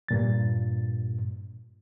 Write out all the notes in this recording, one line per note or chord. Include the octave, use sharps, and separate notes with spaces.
G2 A#2 A6